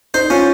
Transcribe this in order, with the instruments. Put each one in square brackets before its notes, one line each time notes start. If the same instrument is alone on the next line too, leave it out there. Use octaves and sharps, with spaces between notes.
[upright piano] D#4 [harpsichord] C5
[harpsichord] C#4 [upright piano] F4